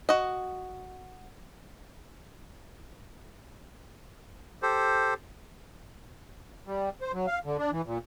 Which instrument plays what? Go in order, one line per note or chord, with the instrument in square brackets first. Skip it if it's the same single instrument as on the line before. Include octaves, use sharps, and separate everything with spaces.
[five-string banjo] F#4 D#5
[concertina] G4 A4 C5
[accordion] G3
C5
F#3
F5
D3
D4
E3
A#2